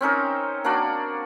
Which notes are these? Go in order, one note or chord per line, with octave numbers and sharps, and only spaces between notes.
C4 C#4 D#4 A#4
A#3 D4 F#4 D5